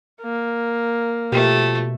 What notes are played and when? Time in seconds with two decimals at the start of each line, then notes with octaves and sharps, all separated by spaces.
0.23 A#3
1.32 B2 F3 A3 G4